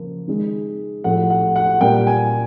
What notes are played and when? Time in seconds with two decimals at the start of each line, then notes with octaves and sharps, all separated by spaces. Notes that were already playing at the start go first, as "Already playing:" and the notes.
Already playing: C#3 F3 A#3
0.28 D#3 G#3
1.04 A2 F3 A3 F#5
1.30 F#5
1.56 F#5
1.81 A#2 G3 A#3 G5
2.07 G#5